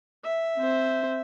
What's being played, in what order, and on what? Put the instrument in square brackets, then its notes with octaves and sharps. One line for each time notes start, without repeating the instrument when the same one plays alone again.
[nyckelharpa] E5
[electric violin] C4 C5